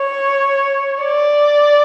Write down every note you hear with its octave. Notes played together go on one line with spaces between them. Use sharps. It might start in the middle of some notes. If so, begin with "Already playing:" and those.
Already playing: C#5
D5